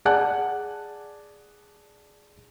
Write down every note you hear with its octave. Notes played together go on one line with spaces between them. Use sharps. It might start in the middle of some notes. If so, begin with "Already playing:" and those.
G#4 D5 F#5 G#5 A5 F#6